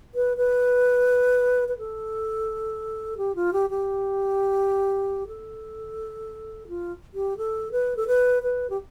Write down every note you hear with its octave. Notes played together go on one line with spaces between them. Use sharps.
B4
B4
B4
A4
G4
F4
G4
G4
A4
F4
G4
A4
B4
A4
B4
B4
G4